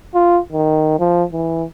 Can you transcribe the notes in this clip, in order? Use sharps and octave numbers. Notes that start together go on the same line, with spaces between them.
F4
D#3
F3
E3